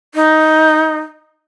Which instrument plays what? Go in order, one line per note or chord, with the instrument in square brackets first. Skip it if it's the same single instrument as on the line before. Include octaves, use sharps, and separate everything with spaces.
[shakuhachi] D#4